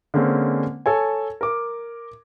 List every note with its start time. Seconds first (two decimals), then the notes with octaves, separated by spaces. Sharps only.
0.14 D3 G#3 A#3 C4 C#4
0.86 A4 C#5 G#5
1.41 A#4 D6